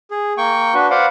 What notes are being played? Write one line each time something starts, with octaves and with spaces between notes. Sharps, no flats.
G#4
A#3 G5 C#6
D4 F#4 B4
B4 C5 D5 F5 F#5